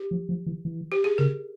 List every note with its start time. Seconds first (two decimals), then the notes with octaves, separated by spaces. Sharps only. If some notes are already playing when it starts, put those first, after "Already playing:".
Already playing: G4
0.11 F3
0.29 F3
0.46 E3
0.65 E3
0.92 G4
1.04 G#4
1.18 C#3 A#4